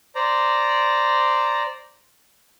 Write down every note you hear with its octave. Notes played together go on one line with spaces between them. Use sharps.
C5 D5 A#5